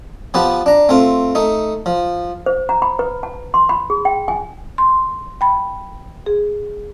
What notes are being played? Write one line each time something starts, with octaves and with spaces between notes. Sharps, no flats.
F3 B3 G4 B4 A5
D4 A#5
A3 C4 F4
A3 D#4
F3
C5
A#5
B5
B4
A5
C6
B5
G#4
G5
G#5
C6
G5 B5
G#4